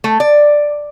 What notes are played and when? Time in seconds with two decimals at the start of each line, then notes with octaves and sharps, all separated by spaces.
0.04 A3
0.20 D5